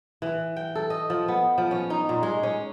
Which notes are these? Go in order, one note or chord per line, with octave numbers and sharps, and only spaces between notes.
E3
G5
A4
D#5
F3
B3
F3
C#4
D#4
A#2
G#3
C#4